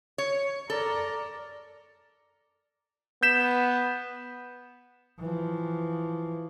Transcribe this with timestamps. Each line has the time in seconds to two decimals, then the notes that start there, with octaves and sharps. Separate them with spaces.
0.18 C#5
0.70 A4 A#4 D5
3.23 B3 G6 B6 E7
5.19 E3 F3